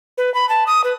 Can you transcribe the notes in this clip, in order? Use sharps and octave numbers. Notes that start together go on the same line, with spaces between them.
B4
B5
A5
D#6
B4